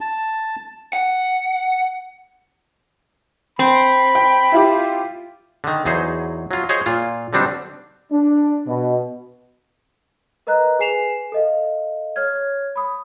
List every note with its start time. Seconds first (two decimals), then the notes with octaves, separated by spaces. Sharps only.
0.01 A5
0.93 F#5
3.59 C4 B5
4.15 G5
4.52 E4 F4 G4
5.64 D3 D#3
5.85 E2 F#3 D#4 G#4 C5
6.51 F#3 F4
6.69 G#4 C5 C#5 D#5
6.86 A#2 F4
7.33 D3 F#3 G3 C4 D4 D#4
8.11 D4
8.67 B2
10.47 A#4 B4 D#5 A#5 F#6
10.79 G#4 B4 G#5 C7 E7 F7
11.32 A4 D#5 F5
12.16 C#5 F6 G#6
12.76 B5 D#6